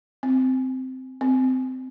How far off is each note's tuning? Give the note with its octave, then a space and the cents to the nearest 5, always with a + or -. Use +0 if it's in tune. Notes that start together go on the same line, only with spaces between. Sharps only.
C4 -10
C4 -20